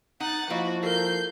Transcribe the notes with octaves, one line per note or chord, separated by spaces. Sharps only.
D#4 F#5 A6
F3 A#3 E4 F#4 D#5
A4 A#4 G6 C7